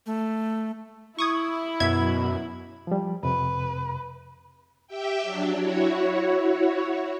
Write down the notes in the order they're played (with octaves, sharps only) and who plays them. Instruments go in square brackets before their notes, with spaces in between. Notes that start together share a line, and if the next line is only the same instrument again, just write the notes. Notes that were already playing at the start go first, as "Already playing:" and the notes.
[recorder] A3
[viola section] E4 [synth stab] C#6 D#6 G#6
[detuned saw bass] F#2 [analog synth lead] B2 [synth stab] E5 G#6
[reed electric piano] F3 G3
[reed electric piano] F2 C3 [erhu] B4
[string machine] G4 E5 G5
F#3 D4
E4 F#4 C#5